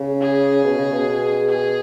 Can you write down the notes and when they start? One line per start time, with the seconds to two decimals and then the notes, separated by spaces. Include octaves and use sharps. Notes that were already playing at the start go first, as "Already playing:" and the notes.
Already playing: C#3
0.21 G#4
0.64 B2
0.78 C#3
0.92 B2
1.49 G#4